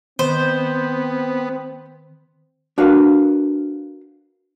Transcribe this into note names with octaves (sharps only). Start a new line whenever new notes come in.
D#3 B3 C4 C5
D4 F#4 A#4 B4 F5